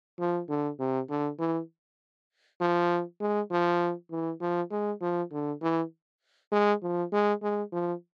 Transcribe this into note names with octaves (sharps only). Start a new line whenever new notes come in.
F3
D3
C3
D3
E3
F3
G#3
F3
E3
F3
G#3
F3
D3
E3
G#3
F3
G#3
G#3
F3